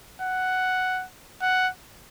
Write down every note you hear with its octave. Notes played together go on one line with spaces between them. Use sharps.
F#5
F#5